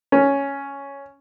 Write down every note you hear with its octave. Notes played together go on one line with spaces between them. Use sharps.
C#4